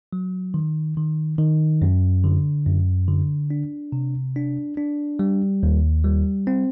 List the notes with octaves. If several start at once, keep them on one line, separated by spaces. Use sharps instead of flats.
F#3
D#3
D#3
D#3
F#2
D3
F#2
D3
D4
C3
D4
D4
G3
D#2
G3
C4